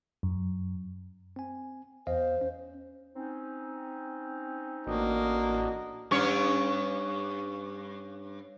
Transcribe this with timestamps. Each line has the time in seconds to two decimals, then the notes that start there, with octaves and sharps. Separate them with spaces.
0.23 F#2
1.36 C4 G#5
2.07 E2 C5 D#5 F5
2.41 C#4
3.14 C4 C#4 D#4
4.87 A1 A#3 D4 F#4 D#5
6.11 G2 C#4 C#5